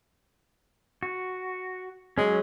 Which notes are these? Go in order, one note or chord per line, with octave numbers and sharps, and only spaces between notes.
F#4
F#3 G#3 C#4